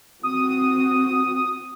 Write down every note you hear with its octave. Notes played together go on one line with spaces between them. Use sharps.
C4 F#4 D#6